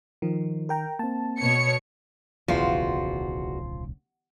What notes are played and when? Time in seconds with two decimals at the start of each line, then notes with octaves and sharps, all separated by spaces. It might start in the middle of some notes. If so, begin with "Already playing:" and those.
0.22 D#3 F3
0.69 A#4 G5 A#5
0.99 A#3 C4 A5
1.40 B2 C#5 C#7
2.48 D1 B1 E2 C#3 F3 F4 F#4